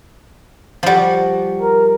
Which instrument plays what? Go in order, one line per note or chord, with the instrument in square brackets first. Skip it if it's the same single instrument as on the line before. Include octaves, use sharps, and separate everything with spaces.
[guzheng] F3 G3 [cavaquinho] F4 F#4
[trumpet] A#4